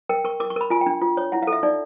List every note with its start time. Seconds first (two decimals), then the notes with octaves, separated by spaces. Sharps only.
0.09 A#4 G5
0.25 A#4 C#6
0.40 A#4 D6
0.50 C#6
0.56 A#4 B5
0.70 F4 G#5
0.81 G5
0.86 D4
1.01 F4
1.17 C#5
1.32 E4 F#5
1.42 F5
1.47 A4
1.52 E5
1.63 D#4 D5